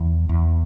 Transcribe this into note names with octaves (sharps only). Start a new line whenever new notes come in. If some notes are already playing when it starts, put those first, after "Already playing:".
Already playing: E2
E2